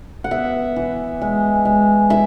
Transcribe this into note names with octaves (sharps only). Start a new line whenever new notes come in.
F#5
B3 E5
E3
G#3
G#3
E4 E5